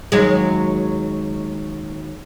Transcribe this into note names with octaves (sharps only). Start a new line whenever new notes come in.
D#2 F#3 G#3